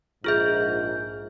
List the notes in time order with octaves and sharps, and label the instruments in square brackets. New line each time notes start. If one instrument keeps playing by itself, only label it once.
[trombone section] A#1 G#2 [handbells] F4 G#4 E5 [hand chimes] F6 G6